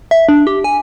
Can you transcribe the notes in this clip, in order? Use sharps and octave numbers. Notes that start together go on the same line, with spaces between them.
E5
D4
G4
G#5